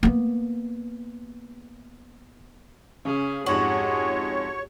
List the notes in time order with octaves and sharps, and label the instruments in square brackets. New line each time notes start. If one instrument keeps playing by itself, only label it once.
[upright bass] A#3 B3
[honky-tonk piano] C#3 [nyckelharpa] C#4 G#4
[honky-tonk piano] F2 G#2 F#7 [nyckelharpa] G#3 G4 [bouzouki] F#4 [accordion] C#5